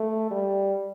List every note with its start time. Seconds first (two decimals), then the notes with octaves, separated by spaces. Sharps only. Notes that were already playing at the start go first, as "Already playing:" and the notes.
Already playing: A3
0.31 G3